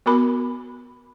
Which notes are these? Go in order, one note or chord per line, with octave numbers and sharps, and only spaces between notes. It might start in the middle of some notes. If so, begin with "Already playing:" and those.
B3 F#4 A#4 B5 D6